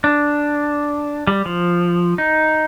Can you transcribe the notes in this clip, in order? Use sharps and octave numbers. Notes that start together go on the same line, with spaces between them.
D4
G3
F3
D#4